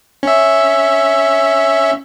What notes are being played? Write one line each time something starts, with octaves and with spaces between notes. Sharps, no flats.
C#4 E5